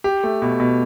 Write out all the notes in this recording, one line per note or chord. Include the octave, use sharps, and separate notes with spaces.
G4
A3
B2
B2